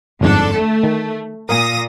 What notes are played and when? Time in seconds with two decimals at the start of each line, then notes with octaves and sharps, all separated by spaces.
0.21 G1 F2 G#2 D3 D4 A4
0.52 A3
0.83 D#3
1.49 A#2 A#4 F5 G#5 D#6 A#6